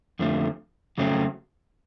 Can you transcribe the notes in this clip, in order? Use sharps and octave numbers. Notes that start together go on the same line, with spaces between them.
F2 D3 F3 A3
F2 C#3 F#3 A3 C4